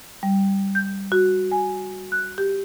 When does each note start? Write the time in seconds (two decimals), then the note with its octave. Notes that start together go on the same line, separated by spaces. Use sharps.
0.23 G3
0.75 G6
1.12 F#4
1.52 G#5
2.12 F#6
2.38 G4